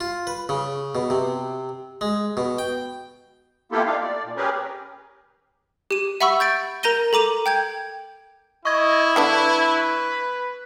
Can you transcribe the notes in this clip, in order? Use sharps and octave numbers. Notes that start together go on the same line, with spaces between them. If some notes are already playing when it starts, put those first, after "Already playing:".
F4
B4
C#3
B2
C3
G#3
B2
G5
A#3 B3 E4 F4 G4 A4
A3 D4 D#4 F4 F5
D5
A#2
C#4 G4 G#4 A#4 B4
G4 D#7
E5 F#5 B5 C#6 E6
G6 A6 D7
A#4 A#5 G6 A#6 D#7 G7
A4 A#5 D6 D#7
G5 G6 G#6
E4 D#5 C#6 G#6
D3 B3 D4 B4